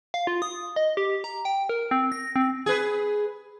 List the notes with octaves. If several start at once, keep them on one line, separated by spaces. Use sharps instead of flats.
F5
F4
D#6
D#5
G4
A#5
G5
A#4
C4
A#6
C4
G#4 B4